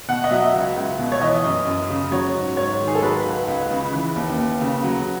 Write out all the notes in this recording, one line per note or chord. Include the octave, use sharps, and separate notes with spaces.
B2 F#5
D#5
F#3 E5
C#2
C#2
B2
C#5
E3 D#5
F#2
F#2
C#3
F#3 C#5
G#2
G#2 C#5
D#3
G#4
A4
F#3 B4
C#2
C#2
C#3
E3
D#2
D#2
C#3
F#3